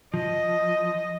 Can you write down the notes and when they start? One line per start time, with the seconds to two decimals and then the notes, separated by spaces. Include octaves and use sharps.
0.14 F3 D#5